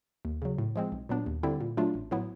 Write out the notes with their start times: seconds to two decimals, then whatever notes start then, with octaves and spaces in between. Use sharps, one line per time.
0.25 D#2
0.42 C#3 F#3
0.59 A2
0.76 F3 G#3 C4
0.92 B1
1.09 A#2 F#3 B3 D4
1.26 D#2
1.43 D3 G3 C4 E4
1.60 A#2
1.77 F#3 A3 D4 F4
1.94 A1
2.11 A2 F#3 B3 E4